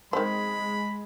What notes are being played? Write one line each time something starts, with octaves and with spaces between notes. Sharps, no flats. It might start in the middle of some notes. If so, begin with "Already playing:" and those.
D#3 G#3 C4 B5